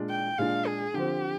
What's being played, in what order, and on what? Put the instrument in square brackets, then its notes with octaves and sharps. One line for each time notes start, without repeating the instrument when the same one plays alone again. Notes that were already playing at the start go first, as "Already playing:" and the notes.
Already playing: [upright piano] A#2 G#3 D4
[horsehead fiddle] G5
[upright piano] A#2 G#3 D4 [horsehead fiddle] F5
[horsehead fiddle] G#4
[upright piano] D3 F3 C4 [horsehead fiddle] G4